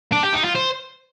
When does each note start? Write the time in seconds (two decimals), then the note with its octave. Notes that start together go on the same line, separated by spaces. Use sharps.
0.12 D4
0.23 G4
0.34 D#4
0.44 F4
0.55 C5